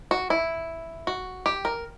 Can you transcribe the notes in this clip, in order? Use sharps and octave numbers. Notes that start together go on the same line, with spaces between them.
F#4
E4
F#4
G4
A#4